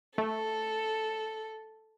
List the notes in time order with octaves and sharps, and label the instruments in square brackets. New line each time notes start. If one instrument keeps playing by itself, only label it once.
[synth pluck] A3 [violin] A4